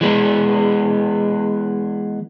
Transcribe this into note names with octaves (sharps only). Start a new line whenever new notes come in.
E3 G#3 B3